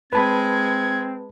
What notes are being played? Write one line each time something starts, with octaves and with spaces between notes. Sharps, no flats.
G#3 C4 B4 A5 B5 G#6